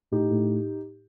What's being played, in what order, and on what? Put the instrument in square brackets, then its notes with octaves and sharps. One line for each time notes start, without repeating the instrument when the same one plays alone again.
[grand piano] A2 D#4 G4
A2